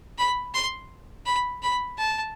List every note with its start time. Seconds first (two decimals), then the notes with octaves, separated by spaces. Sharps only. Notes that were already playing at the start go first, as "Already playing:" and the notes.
0.18 B5
0.54 C6
1.26 B5
1.63 B5
1.98 A5